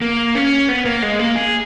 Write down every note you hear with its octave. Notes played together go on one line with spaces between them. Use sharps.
A#3
C#4
B3
A#3
G#3
A#3
G#4